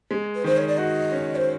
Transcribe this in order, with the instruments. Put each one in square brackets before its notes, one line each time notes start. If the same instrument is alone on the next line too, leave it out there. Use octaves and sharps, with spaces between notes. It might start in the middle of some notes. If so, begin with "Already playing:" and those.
[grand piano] G#3
[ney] B4
[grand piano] D#3 [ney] C5
[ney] C#5
D5
[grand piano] F#4 [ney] D#5
[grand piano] C#4
[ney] C5